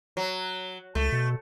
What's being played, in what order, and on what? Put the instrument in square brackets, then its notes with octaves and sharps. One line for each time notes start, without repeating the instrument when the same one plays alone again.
[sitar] F#3
[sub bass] C#2 [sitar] A3
[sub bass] B2